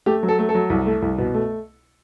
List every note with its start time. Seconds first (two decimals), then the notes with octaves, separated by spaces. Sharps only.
0.06 A3 G4
0.23 F#3
0.28 A4
0.39 A3
0.49 A4
0.55 F#3
0.70 C2
0.86 A3
1.02 C2
1.18 B2
1.34 A3